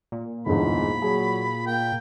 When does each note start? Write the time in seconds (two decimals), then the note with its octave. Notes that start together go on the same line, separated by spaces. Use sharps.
0.12 A#2
0.46 G1 E2 G#2 B5
1.02 F#3 G#4
1.66 A#3 G5